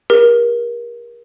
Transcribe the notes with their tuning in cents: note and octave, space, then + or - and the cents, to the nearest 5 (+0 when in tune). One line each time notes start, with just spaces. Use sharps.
G4 +45 A#4 +30